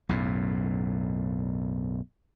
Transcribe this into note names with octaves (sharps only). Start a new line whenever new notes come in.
B1 F#2 A2